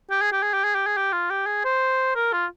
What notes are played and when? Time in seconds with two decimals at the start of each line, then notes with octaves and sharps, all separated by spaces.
0.10 G4
0.22 G#4
0.32 G4
0.43 G#4
0.54 G4
0.64 G#4
0.75 G4
0.87 G#4
0.97 G4
1.13 F4
1.31 G4
1.46 G#4
1.65 C5
2.15 A#4
2.33 F4